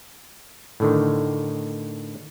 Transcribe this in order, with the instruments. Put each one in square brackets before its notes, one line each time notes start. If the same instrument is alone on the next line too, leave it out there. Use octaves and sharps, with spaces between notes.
[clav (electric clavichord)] A2 D3 D#3